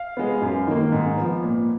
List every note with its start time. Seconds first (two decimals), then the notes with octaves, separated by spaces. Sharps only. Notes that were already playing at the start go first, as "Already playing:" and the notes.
Already playing: F5
0.17 G#3 B3
0.42 F#2
0.67 D#3 A#3
0.92 G#2
1.17 F3 B3
1.43 A#2